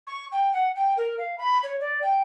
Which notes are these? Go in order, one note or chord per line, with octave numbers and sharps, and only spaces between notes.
C#6
G5
F#5
G5
A#4
F5
B5
C#5
D5
G5